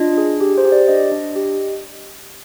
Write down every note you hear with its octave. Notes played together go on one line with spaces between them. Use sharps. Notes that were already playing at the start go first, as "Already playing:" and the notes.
Already playing: D4 F4 D#5
G#4
G4
C5
G4
D5
D4 D#5
D4
G4